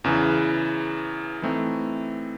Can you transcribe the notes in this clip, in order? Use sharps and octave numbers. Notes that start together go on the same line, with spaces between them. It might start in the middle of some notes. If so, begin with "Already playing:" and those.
E2 C#3 E3
E3 A3 C4 D#4